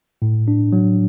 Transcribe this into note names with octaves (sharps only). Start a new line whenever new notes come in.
A2
D4
F#3